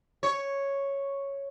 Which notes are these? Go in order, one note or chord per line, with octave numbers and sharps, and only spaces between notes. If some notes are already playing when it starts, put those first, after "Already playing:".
C#5